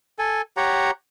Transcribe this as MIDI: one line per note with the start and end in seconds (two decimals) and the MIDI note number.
0.19 0.42 69
0.19 0.42 80
0.57 0.91 67
0.57 0.91 73
0.57 0.91 78
0.57 0.91 82